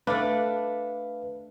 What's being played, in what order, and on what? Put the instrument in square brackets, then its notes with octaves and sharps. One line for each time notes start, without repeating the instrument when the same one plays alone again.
[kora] A3 D4 [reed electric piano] B4 F5